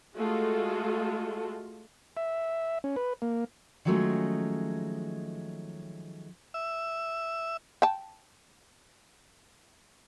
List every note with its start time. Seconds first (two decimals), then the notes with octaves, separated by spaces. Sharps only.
0.16 G#3 A3 F4 F#4 A4
2.17 E5
2.84 C#4
2.96 B4
3.22 A#3
3.85 D#3 F3 F#3 G#3 A3 C#4
6.54 E5
7.82 G5 A5